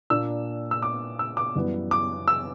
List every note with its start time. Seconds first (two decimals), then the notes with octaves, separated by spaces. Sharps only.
0.10 A#2 A#3 D4 E6
0.71 E6
0.82 D6
1.19 E6
1.37 D6
1.55 F#2 E3 G3 B3
1.91 D6
2.28 E6